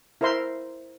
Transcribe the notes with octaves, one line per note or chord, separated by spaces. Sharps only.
E4 A#4 C5 E5 C6